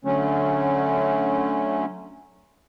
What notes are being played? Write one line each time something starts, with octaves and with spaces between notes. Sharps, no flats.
D3 F#3 A3 C#4